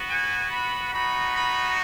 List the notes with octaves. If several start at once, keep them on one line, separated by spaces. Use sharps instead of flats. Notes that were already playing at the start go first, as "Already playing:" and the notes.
Already playing: B3 F#4
G#5
B5
B3 D#4 F#4 B5
B5